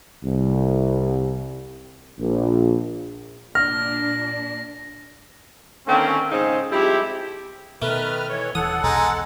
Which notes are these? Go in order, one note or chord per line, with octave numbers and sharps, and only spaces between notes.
C2
A#1
A#2 D4 F6 A#6
D3 D#3 A#3 C4 C#4
G#2 C#3 C4 D#4 F4 G#4
F3 G3 G#3 C4 E4 G4
B2 D#3 A3 B4 F6
E3 C#5
D#1 E3 A4 F#5 D#6
B1 E2 B2 G#3 D#4